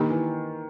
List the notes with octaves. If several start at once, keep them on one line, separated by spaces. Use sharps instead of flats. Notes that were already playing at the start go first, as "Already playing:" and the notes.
Already playing: D#3 A#3 D4 G4
E3